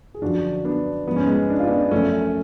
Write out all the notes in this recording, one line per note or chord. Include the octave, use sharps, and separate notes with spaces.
G#4
F#2 D3 F3 D4 F#4
B3 D4
G#2 F3 B3
C#4
G#3 B3
D4
F4
B3 D4
F#2 F3 A3 C#4